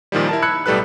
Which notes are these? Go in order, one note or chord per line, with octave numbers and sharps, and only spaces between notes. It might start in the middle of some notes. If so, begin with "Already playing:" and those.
A#2 D#3 F3 G3
E4 A#4 A5
B5 E6 F#6 G#6 C#7
B1 A2 G3 A4 B4 F#6